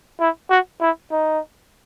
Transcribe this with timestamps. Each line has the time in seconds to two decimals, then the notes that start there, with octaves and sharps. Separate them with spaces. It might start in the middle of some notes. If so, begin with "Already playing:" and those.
0.20 E4
0.50 F#4
0.81 E4
1.11 D#4